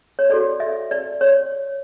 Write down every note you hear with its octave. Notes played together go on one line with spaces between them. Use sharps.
C#5
F#4 A4 C#5 D5
E5
D5
C#5